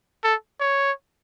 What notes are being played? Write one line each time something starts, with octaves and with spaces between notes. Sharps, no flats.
A4
C#5